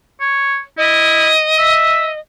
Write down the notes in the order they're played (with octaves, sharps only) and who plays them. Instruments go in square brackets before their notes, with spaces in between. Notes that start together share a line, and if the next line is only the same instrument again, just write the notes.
[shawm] C#5
[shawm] E4 [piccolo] D#5
[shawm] E5